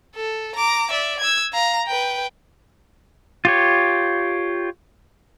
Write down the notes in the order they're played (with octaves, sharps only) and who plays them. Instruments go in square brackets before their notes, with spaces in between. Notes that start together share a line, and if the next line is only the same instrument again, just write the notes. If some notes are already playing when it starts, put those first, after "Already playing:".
[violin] A4
A#5 D6
D5 E5
E6 G#6
F5 A#5
B4 G5
[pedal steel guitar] F4 G4 C#5